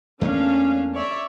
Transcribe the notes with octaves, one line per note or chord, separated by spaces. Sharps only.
E2 A3 A#3 C#4 D4 F5
C#5 D5 E5